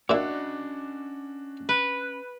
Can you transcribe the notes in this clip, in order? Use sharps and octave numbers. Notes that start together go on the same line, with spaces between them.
A#2 C#4 D4 E4 F#4 D#5
B4